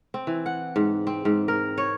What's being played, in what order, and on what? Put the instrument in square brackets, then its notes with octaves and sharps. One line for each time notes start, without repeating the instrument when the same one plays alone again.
[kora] C4
E3
F#5
G#2
C4
G#2
A#4
C#5